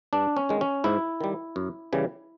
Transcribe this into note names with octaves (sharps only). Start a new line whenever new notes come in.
G2 D4
C#4
D#3 G#3
C#4
G#2 E4
D#3 G3
F#2
C#3 E3 G3